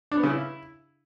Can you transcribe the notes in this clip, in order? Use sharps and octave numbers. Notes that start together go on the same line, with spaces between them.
D4
B3
C#3
E4